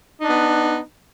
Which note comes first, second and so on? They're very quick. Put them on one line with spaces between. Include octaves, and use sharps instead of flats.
D#4 D4 B3